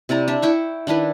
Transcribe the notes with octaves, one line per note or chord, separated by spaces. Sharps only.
C3 E4 D5 A#5
D4 E5
E4 G5 C#6
D#3 D4 E4 B4